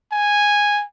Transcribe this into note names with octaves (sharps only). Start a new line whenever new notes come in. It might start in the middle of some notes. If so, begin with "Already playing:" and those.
G#5